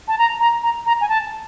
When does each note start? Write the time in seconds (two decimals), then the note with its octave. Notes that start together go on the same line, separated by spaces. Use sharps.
0.08 A5
0.18 A#5
0.40 A#5
0.63 A#5
0.86 A#5
1.01 G#5
1.09 A5